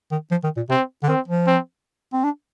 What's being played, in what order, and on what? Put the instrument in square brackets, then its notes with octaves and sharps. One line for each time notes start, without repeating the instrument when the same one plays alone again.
[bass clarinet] D#3
F3
D#3
A#2
[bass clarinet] C3 [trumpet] C4
[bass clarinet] D3
[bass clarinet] D#3 [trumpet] C4
[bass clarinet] F3
[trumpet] C4
[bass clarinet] C4
D4